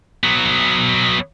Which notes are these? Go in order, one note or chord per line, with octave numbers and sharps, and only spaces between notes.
F#3 B3